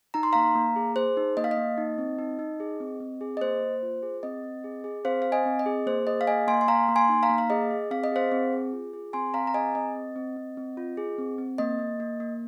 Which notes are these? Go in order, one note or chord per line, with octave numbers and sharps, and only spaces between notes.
D#4 A#5
C6
A#3 F5 A#5
A#3
G#4
G#4 C5
D#4
A#3 D#5
F5
D#5
A#3
D#4
C4
D#4
D#4
G#4
C4
C4
G#4
D#5
A#3 C5
A#3
F4
G#4
C4 D#5
C4
G#4
G#4
C4 C5 F5
C4 F5
D#5 G#5
C4
D#5
G#4
A#3 C5
G#4 D#5
F5
A#3 D#5 G#5
A#3 G#5 C6
C6
A#3 F5 A#5
A#3
G#5 C6
D#4
F5 A#5
A#3
F5
G#4 D#5
G#4
C4 F5
D#5
G#4 C5 F5
C4
G#4
F4
G#4
C4 G#5 C6
C4 F5 A#5
A#5
G#4 D#5 G#5
C4 D#5
C4
C4
C4
C4
F4
G#4
C4
C4
A#3 D#5
A#3
A#3
A#3